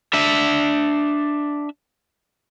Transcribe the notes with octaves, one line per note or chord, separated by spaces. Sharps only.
D4 E5